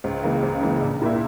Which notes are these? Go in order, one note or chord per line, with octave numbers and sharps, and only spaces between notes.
C#2
C#3 E3 A#3
C#2
C#3 E3 A#3
A#1
A#2 A#3 E4